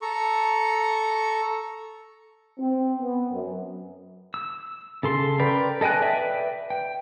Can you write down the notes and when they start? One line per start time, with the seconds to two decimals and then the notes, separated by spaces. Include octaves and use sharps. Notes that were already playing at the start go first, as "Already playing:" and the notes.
0.02 A4 A#5 C#6
2.58 C4
3.01 B3
3.31 F#2
4.34 E6
5.03 C#3 A4 C6
5.39 A#4 B4 D5 G5
5.81 A4 D#5 G5 G#5 F#6
6.02 B4 D5 E5 G5
6.70 G5